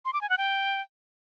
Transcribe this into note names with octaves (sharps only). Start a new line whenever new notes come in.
C6
D6
G#5
F#5
G5